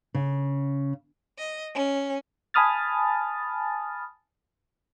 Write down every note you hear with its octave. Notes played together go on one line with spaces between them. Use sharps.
C#3
D#5
C#4
G#5 A5 B5 D#6 F6 A6